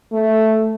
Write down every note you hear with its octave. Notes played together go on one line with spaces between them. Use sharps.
A3